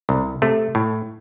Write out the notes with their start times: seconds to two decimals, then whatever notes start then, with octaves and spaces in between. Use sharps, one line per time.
0.09 C2
0.42 C3 A3
0.75 A2